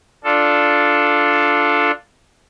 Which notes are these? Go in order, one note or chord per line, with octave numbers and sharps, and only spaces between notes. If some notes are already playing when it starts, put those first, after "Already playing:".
D4 F4 A4